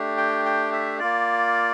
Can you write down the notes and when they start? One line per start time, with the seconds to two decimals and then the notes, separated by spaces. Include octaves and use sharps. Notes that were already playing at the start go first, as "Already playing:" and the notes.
Already playing: A3 D4 G4
0.18 G5
0.45 G5
0.72 E5
0.99 A#3 F4 D5